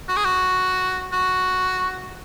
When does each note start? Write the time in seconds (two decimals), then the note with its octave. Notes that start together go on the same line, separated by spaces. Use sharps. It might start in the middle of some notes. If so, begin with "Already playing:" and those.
0.09 F#4
0.17 G#4
0.24 F#4
1.13 F#4